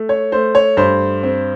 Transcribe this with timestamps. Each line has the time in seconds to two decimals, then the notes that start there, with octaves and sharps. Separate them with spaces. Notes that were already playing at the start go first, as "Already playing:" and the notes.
Already playing: A3
0.09 C#5
0.32 A3 C5
0.55 C#5
0.77 G2 C5
1.23 C4